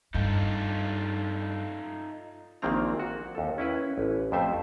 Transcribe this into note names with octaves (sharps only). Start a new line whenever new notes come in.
G2 D#4 F4 A4
A#1 A#2 D#3 A#3 C4 A#5
F#4
D#2 A4
C#4 E4 B4
A1
F2 F3 A3 C5 E5